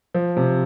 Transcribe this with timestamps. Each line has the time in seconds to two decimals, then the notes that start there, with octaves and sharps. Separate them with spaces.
0.14 F3
0.37 C3